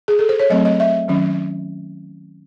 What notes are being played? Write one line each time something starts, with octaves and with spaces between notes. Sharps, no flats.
G#4
A4
C5
C#5
F#3 A3 C4 D#5
D#5
E5
D#3 F#3 C#4